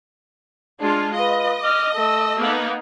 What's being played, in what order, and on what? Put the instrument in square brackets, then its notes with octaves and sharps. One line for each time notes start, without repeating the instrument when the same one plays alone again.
[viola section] G#3 F4 [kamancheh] D4 A5
[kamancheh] F4 B4 [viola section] D#5
[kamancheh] D6 F6
A3 E6
[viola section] A#3 B3 D#4